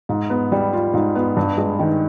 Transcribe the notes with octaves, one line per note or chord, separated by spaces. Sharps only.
G#2
B3
G3
F4
G#2
B3
G2
G#3
D#3